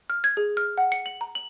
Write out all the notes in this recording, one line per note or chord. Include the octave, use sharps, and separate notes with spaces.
F6
G#6
G#4
F6
F#5
C#7
F#7
A#5
F#7